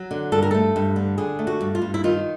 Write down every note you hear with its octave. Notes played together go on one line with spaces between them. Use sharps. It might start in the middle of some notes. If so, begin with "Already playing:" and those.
Already playing: F#3
D3
G2 A4
A#4
A3 A4
G2
D3
D3 G#4
A3
F#4
G2
F4
G2
E4
D#3 F4